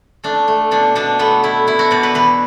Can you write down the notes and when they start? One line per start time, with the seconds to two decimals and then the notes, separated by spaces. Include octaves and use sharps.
0.24 A3 D4
0.48 A3
0.71 B2 D4
0.95 B2 D4
1.19 A3 B3
1.43 A3 E4
1.67 B2 E4
1.79 F#4
1.91 B2 D5
2.03 B4
2.14 E3 B4